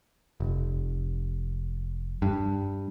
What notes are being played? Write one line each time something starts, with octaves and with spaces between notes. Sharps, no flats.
F1
G2